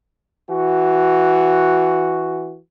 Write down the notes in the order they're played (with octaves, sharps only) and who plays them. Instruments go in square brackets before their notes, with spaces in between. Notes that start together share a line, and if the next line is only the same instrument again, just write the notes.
[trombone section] E3 F#4